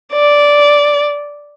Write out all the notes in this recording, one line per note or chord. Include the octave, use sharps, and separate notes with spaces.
D5